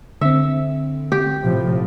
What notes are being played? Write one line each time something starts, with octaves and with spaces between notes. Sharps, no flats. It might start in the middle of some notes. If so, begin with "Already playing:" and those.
D3 C4 E5
G4
A2 C3 F3